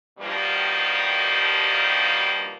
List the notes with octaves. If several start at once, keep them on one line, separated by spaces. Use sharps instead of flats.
G2 B2 D#3 F3 G3 A#3